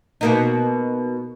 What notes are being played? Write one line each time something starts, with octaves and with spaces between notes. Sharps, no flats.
B2 A#3 D#4